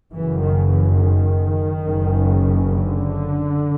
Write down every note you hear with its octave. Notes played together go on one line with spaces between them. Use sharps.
F#1 F#2 C#3 E3
D#3
E3
D#3
F#1 F#2 C#3
D3